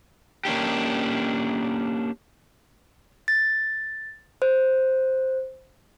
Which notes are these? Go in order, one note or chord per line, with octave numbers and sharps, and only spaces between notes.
A#3 C#4 D4 G4
A6
C5